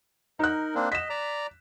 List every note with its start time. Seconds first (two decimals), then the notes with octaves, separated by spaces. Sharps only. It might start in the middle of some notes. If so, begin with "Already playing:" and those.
0.39 D#4 A#4 F#6
0.75 A#3 C4 D4
0.92 D#5 B6 E7
1.10 D5 A#5